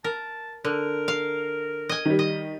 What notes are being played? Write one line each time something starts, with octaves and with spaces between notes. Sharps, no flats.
A#4 A5
D3 A#4
F5
D#5 G#5
D#3 G3
D#5